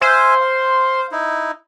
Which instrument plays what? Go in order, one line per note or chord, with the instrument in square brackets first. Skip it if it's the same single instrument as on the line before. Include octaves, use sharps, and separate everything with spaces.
[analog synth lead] C5 [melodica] E5 F5 G#5
[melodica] F5
D#4 E4